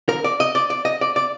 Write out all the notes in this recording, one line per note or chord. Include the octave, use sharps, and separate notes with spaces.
A#4
D5
D#5
D5
D5
D#5
D5
D5